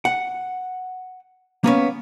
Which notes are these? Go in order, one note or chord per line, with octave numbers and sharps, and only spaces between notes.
F#5
A#3 B3 C#4